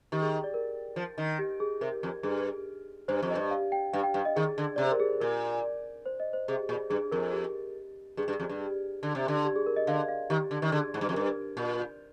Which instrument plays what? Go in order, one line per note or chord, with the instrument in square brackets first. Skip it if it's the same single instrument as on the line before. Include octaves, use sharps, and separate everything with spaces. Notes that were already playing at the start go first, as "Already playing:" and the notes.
[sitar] D#3 [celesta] G4
[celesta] G#4
D5
A#4
[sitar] F3
D#3
[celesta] G4
G#4
[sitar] C3 [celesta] A#4
[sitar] F2
[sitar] G2 [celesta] G#4
[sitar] G2 [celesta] C5
[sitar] F2
[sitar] G2 [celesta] D#5
[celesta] F5
G5
[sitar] G2 [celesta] F5
[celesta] G5
[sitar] G2 [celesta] F5
[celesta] D#5
[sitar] D#3 [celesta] G#4
[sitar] D3
[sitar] C3 [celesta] D5
[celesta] C5
A#4
G#4
[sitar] A#2 [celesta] A#4
[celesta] C5
D#5
C5
[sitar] C3 [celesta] G#4
[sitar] A#2 [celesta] G#4
[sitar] G2 [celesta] G#4
[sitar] F2 [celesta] A#4
[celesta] G4
[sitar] G2 [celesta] G#4
[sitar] G2
F2
G2
D3
C3
D3
[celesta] G4
G#4
A#4
D#5
[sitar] D3 [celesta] F5
[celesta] F5
[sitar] D#3 [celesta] G4
[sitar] D3
D#3
[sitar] D3 [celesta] G#4
[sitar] G#2
G2
F2
[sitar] G2 [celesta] A#4
[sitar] A#2